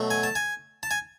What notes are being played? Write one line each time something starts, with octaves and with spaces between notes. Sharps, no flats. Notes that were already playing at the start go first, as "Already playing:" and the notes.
Already playing: B2 F#3 A3
G#5
A5
G#5
A5
G#5